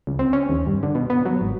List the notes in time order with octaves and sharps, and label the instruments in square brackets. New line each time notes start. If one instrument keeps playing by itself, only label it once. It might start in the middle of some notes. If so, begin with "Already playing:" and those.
[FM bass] C#2
C4
C#4
D#2
G2
D3
B2
B3
F#3
G#1